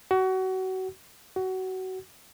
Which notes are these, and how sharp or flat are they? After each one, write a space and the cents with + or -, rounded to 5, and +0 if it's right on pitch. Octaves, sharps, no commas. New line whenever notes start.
F#4 +25
F#4 +20